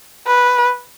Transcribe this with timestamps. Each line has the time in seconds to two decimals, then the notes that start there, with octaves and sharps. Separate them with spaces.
0.27 B4